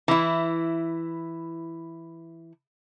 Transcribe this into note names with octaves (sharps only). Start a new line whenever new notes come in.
E3 E4